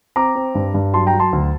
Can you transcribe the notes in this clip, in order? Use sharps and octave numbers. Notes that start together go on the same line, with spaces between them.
C4 A#5 D6
C4
G2
G2
F#3 A5 C6
G5 A#5
F#3
A5 C6
D2